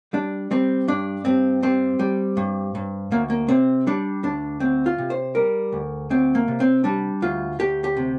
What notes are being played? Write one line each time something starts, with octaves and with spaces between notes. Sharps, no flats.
G3 D4
G3 C4
G2 D4
G2 C4
G3 C4
G3
G2
G2
D2 A#3
A#3
C3 C4
G3 D4
D2 D4
D2 C4
F4
C3
C5
G3 A#4
D2
D2 C4
A#3
C3
C4
G3 D4
D2 F4
D2 G4
G4
C3